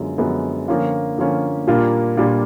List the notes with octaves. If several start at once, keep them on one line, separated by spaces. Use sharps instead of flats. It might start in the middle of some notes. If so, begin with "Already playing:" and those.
Already playing: F#2 D3 F3 G#3 B3
F#2 D3 F3 G#3 B3
D3 F3 A#3 C#4 F4
D3 F3 A#3 C#4 F4
A#2 G3 A#3 D4 F4
A#2 G3 A#3 D4 F4